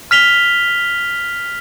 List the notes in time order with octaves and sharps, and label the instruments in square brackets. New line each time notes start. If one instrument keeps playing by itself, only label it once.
[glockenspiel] F6 B6 F7 G7